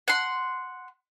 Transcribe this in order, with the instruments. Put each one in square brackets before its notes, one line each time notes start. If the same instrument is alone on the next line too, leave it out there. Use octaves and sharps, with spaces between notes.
[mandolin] F#5 C6